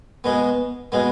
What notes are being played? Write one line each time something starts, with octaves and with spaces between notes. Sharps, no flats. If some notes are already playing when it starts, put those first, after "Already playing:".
B2 G#3 B3
B2 G#3 B3